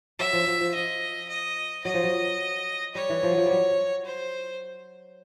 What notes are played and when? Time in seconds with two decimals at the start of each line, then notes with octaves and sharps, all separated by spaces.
0.19 F#3 E5
0.33 F3
0.47 F3
0.61 F3
0.75 F3 D#5
1.29 D#5
1.85 F#3 D#5
1.94 F3
2.04 F#3
2.95 G3 C#5
3.09 E3
3.23 F3
3.31 F#3
3.37 F3
3.46 F#3 G3
4.05 C5